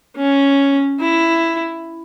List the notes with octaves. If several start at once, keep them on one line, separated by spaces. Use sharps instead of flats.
C#4
E4